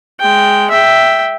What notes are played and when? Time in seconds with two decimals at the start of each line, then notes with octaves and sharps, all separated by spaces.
0.20 G#3 G5
0.70 E5 G5